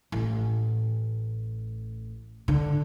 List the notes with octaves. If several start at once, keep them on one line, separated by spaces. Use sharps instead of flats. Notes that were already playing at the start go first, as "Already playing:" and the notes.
A1
D3